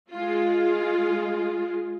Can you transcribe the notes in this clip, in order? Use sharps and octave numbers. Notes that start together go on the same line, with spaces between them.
G#3 F4